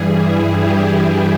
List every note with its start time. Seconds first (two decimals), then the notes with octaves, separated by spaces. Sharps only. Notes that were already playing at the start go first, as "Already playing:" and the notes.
Already playing: G2 E3 G3 G#4
0.13 E4
0.57 G4
1.02 G4